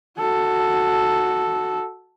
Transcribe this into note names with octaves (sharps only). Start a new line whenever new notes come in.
F#4 A4